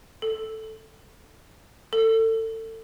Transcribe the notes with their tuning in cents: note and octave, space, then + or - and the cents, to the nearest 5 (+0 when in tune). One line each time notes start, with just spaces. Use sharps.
A4 +0
A4 +30